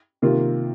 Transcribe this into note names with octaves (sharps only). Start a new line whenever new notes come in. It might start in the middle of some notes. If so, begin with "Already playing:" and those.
C3 D#3 A#3 F4